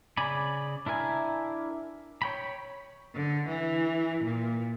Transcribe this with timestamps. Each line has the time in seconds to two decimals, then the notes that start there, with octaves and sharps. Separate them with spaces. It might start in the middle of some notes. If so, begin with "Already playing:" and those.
0.17 C#3 D5 G#5 B5
0.86 D4 E4 A#4 G#5
2.22 C#5 G5 B5
3.15 D3
3.49 E3
4.24 A#2